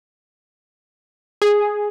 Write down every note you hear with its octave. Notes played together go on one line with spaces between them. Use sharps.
G#4